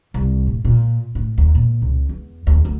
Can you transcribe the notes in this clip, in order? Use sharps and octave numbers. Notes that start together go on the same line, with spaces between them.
C2
A2
A#2
A2
D#2
A#2
C#2
E2
D#2
D2